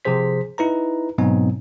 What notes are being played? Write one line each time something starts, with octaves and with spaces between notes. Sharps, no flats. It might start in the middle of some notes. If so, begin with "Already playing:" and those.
C3 F3 G#4 C5 B6
D#4 E4 B4 A#5
G#2 B2 F#3 B3 C4 D#4